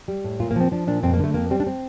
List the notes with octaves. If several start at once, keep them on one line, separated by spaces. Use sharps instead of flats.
G3
A2
A#2 F4
A#3
F3 C4
F3 D4
A#2 D4
F2 C4
A#3
D3 A3
F2 A#3
G3 C4
D4
C4